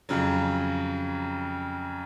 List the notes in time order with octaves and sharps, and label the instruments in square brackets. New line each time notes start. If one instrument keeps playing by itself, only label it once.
[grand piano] F2 C#3 F#3